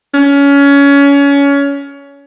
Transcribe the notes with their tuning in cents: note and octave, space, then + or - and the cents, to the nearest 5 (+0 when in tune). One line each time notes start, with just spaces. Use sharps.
C#4 +25